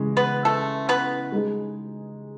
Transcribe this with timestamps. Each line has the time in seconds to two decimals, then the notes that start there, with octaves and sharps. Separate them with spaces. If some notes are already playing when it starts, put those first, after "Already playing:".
Already playing: C#3 E3 G#3
0.17 B3 B4
0.45 A3 A4
0.89 B3 B4
1.32 G#3 D#4 G#4